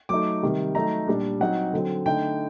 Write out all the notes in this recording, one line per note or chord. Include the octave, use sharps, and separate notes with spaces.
F#3 A3 D#4 D6
C3 D#3 G3
F#3 A3 D#4 A#5
A#2 G3 D4
F#3 C4 D#4 F#5
D3 F#3 C4
D3 A3 D#4 G5